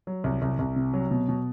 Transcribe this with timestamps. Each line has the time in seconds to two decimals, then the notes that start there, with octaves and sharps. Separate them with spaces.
0.07 F#3
0.24 C2
0.42 C2
0.59 C2
0.76 C3
0.94 F#3
1.11 B2
1.29 B2